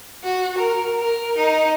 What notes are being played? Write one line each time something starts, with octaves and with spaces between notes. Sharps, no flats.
F#4
A#4
A#4
D#4